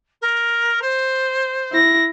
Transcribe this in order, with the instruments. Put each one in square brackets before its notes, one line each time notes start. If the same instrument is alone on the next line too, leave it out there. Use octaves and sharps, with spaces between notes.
[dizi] A#4
C5
[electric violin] E4 A#6